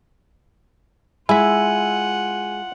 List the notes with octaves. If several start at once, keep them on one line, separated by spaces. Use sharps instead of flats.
G#3 E4 F4 E5 F#5 G#5